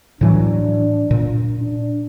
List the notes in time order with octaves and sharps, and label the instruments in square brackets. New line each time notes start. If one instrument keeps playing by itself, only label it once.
[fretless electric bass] A2 E3 F#3 [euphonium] D4
[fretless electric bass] A#2
[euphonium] D4